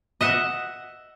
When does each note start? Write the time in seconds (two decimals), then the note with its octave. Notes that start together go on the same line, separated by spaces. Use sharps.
0.21 D#5 E5 F#5